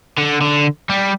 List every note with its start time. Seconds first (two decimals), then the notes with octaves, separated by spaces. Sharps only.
0.18 D3
0.41 D3
0.90 G3